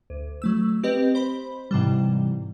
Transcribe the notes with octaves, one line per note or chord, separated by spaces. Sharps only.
D2
F#3 A3 E6
C4 G4 B4 D#5
C5 B5
G#2 C3 E3 G3